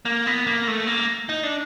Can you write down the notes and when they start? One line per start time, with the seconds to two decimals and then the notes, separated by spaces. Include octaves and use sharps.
0.05 A#3
0.26 B3
0.47 A#3
0.67 A3
0.87 A#3
1.29 D#4
1.43 D4